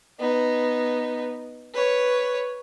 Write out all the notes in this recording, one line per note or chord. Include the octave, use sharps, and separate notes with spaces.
B3 D#4
B4 C#5